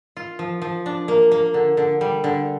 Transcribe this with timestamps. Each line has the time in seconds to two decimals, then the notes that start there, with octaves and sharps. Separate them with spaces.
0.17 F4
0.39 F3
0.62 F3
0.86 D4
1.08 A#3
1.32 A#3
1.54 D3
1.77 D3
2.01 G3
2.24 D3